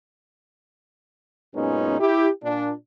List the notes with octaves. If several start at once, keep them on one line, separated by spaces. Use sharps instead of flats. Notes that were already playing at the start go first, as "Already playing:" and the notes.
F#2 A#2 G#3 B3 C#4 D#4
E4 G4
A#2 D4